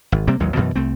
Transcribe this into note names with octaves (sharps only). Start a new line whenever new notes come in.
G#1
C3 G3 A#3 C4
A1 D#2 F#3 G#3
F#2 B2 E3 F#3
C2 A3 C4